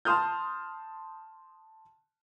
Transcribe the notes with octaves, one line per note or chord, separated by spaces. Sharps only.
A5 C6 D#6 F6 G6